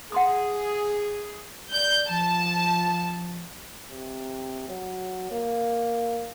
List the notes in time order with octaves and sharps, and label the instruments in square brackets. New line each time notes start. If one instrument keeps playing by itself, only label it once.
[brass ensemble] G#4 [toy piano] F#5 C6 D#6
[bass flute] D5 [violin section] G6
[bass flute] F3 [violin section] A5
[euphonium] C3
F#3
A#3